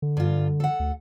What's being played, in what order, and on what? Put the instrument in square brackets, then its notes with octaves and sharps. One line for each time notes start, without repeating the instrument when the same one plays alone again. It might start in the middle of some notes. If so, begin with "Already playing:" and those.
[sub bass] D3
[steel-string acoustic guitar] G2 F4
A4 F#5
[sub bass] D2